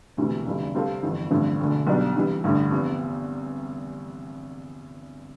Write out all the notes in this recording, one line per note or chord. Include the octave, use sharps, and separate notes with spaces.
E1 D2 C3 E3
F1 F2 D3 G3
C3 G3 C4 F4 A4
G1 F2 E3
A1 G2 D3 F3 C4
E1 D2 D3
B1 B2 G3 D4
C3 E3 G3
A1 G2 D3
E2 C3 F3 B3